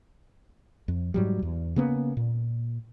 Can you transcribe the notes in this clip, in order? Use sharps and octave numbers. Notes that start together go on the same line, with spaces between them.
F2
G#2 F#3 G3
E2
C#3 A#3 B3
A#2